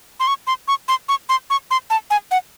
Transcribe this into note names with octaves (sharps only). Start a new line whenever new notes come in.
C6
C#6
C6
C#6
C6
C#6
C6
C#6
C6
A5
G#5
F#5